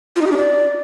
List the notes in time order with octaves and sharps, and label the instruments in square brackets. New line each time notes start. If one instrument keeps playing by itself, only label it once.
[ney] F4
D#4
G4
D4
D5